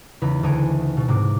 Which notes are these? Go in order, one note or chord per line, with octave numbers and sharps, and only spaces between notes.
E2 C#3 D#4 B4 B5
D2 C#3 E3 D#4 G#5 D7
B2
G#2 C3 C4 D6